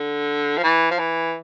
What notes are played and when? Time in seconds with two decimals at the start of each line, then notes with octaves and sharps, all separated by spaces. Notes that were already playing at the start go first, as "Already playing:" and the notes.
Already playing: D3
0.58 F3
0.63 E3
0.91 F3
0.99 E3